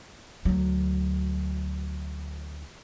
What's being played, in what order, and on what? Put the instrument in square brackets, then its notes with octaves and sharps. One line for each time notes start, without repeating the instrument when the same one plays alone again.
[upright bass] D2 F#3